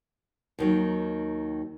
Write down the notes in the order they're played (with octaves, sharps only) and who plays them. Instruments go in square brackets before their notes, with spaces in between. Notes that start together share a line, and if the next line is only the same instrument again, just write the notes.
[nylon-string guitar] D#2 D#3 F#3